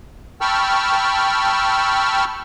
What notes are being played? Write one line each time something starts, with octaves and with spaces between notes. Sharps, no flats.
G5 A5 B5 C#6 E6 F6